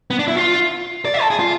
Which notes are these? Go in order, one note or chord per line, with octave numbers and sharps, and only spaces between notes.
B3
D4
E4
F4
D5
E5
A4
G#4
F4